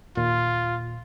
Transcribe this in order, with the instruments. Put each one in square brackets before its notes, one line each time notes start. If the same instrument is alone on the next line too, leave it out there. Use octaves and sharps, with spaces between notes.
[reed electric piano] D#2 A#2 [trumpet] F4